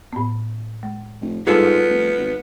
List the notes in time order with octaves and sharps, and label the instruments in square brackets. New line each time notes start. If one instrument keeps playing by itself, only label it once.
[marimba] A2 B3
G#3
[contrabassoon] F1
[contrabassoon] G#2 [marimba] G3 [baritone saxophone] B3 [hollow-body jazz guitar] F4 G#4 A4
[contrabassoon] F1
G#1